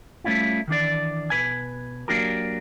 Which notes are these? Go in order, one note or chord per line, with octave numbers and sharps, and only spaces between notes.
G3 A3 A#3 C#4 E4 F4
D#3 E3 D4 D5
B2 B4 G#5
F#3 A#3 D4 F#4 G4 A#4